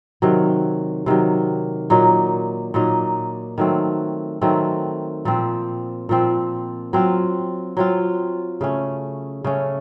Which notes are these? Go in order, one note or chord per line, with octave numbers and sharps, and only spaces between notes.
C3 D#3 F#3
C3 D#3 F#3
A#2 F#3 A#3 D#4
A#2 F#3 A#3 D#4
D#3 F#3 A3 C4
D#3 F#3 A3 C4
A#2 F3 C4
A#2 F3 C4
F#3 C4 F4
F#3 C4 F4
C#3 A3 C#4
C#3 A3 C#4